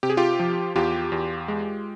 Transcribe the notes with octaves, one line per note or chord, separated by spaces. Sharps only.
C3 G4
G#4
F4 G4
F3
E2 F4 G4
E2
G#3